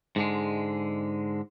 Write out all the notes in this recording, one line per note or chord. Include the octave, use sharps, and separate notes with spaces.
G#2 D3 G#3